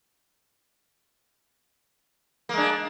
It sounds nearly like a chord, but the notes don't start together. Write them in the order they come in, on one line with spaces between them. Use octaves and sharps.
A#3 G#3 D4